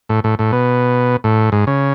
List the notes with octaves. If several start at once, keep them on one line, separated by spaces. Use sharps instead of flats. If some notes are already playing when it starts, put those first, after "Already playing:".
A2
A2
A2
B2
A2
G#2
C#3